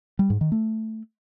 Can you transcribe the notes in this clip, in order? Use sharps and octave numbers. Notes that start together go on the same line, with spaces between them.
G3
G#2
D#3
A3